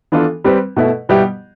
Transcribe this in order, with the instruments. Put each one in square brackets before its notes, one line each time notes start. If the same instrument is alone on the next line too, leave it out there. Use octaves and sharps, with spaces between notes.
[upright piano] E3 B3 D4 F4 A4
G3 C4 G4 B4
B2 A3 E4 B4
B2 G3 B3 E4 G4